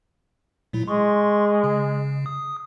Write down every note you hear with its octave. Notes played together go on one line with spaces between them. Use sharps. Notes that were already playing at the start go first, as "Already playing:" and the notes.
A#2 F#3 E4
G#3 C6 C#6
C#3
D#6